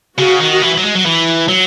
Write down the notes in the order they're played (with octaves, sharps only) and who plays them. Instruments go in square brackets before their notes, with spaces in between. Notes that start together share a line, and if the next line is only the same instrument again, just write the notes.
[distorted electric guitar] C#3 [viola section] F#4
[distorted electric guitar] D#3
E3
F#3
G#3
F#3
E3
F#3